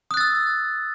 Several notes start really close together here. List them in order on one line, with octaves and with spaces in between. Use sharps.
D#6 F#6 A6 E6